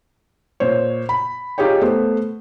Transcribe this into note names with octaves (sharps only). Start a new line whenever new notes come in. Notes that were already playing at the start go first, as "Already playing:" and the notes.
A#2 C5 C#5
B5
D#4 F4 G4 G#4 C#5 G5
A3 B3 C5